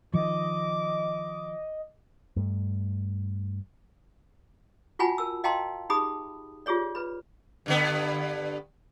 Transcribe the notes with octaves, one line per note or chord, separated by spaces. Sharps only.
D#3 F3 D#5 D6
G2 A3
F4 F#4 F#5 G#5 A5 B5
A#4 E6
D#5 F5 G5 A5 A#5 C6
D#4 G4 G#4 B5 D#6
F4 G4 G#4 C#5 D5
B4 B5
G2 D3 B3